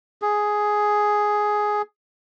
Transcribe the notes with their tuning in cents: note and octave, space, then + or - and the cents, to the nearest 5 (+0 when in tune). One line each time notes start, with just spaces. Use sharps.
G#4 +5